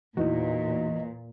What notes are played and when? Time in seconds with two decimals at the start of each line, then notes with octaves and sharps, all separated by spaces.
0.17 E2 A#2 E3 D#4 F#4 D#5